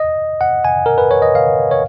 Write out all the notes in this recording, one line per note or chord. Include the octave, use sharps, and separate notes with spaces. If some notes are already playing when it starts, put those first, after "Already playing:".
Already playing: D#5
F#5
G#5
A#4
B4
C#5
D#5
F5
C#5